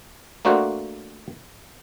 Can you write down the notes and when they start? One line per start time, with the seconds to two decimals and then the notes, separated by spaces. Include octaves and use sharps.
0.45 A3 A#3 D4 F#4 C5 F#5